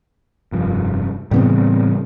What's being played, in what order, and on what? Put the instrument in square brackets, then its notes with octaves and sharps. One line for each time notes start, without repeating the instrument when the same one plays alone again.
[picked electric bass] F1 G2 F3
[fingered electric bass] A2 B3 C4 [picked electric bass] C#3 E3 G3